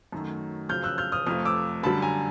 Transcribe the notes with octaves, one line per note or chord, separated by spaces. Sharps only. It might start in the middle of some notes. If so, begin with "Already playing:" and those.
F#2 D#3 F#3 A3
F#2 C#3 F3 F6 G6
E6 F#6
F6 G6
D#6 F6
F2 C3 F3 A3 D#6 F6
D6 E6
F#2 D3 G3 A5 B5
G#5 A#5